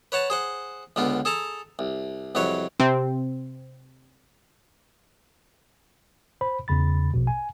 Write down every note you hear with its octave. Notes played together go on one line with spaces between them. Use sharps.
B4 C#5 F#5 A5
G#4 C5 F#5
C#2 D3 B3 F4
G#4 A4 A5 A#5
C2
C2 F2 F#3 B4 C#5
C3 C4
C5 B5
E2 C#3 B5 A6
A#1 B2
G#5